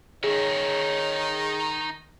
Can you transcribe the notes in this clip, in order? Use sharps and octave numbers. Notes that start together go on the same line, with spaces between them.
D#3 D#4 G#4 C#5 E5